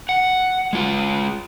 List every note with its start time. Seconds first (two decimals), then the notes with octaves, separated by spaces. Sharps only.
0.09 F#5
0.73 G#3 F4